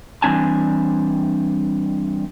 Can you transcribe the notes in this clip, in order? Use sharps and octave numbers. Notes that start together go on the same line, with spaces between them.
E3 G3 C4 D4 G#5 A5